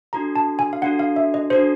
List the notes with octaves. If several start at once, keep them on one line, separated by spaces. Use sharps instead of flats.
D4 F#4 A4 A#5
A5
G#5
F5
D4 F#4 A4 F#5
F5
E5
D#5
D4 F#4 A4 C5